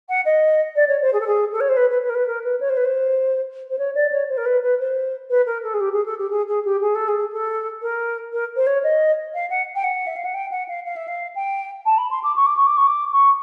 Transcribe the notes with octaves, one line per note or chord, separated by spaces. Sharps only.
F#5
D#5
D5
C#5
C5
G#4
A4
G#4
A4
C#5
C5
B4
B4
B4
A#4
B4
A#4
B4
C#5
C5
B4
C5
C5
C#5
D5
C#5
C5
A#4
B4
B4
C5
B4
A#4
A4
G#4
G4
G#4
A4
G4
G#4
G#4
G4
G#4
A4
G#4
A4
A#4
A#4
C5
C#5
D#5
F5
F#5
G5
F#5
E5
F5
F#5
G5
F#5
F5
F5
E5
F5
G5
A5
B5
C6
D6
C#6
D6
C#6
D6
C#6
D6
C#6